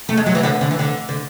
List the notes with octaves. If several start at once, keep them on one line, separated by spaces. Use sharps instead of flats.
A3
G#3
F#3
E3
D3
D3
E3
D3
D3